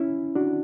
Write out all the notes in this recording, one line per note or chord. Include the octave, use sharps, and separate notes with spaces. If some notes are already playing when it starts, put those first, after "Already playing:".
Already playing: C#4 E4
D4 F#4